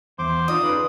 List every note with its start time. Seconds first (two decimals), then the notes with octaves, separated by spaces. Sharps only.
0.19 E2 C5 C6 D6
0.48 D#4 F4 D5 D#6
0.63 C#3 B4